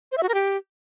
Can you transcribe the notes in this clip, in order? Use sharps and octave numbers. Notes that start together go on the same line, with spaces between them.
C5
E5
F#4
A#4
G4